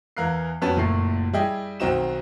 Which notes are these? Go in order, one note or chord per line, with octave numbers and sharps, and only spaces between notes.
E2 E3 A#4 F5 F#6 C7
F2 F#3 B3 C#4 A5
F#1 A#2 A3 C7
G3 E4 G#4 D#5 G5
B1 D#3 C4 D#4 F#4 E7